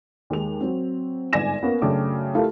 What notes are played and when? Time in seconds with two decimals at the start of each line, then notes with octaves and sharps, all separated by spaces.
0.30 D#2 G#3 F7
0.61 F#3 C4
1.33 G1 G#2 D5 G#5 A#6 E7
1.62 A#3 B3 C#4 F4
1.82 F#2 C#3 A3 D4 G5 D6
2.34 A3 E4 F4 G4 A4 A#4